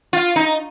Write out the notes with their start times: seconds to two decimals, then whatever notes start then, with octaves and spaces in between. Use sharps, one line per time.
0.13 F4
0.36 D#4